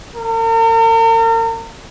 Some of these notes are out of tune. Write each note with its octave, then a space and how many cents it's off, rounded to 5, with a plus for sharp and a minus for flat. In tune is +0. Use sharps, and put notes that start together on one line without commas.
A#4 -40